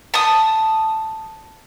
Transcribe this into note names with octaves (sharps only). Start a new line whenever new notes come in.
A5 D#6